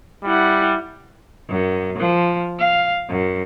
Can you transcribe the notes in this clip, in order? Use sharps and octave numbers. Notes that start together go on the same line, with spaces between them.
G3 E4 F#5
F#2
F3
F5
F#2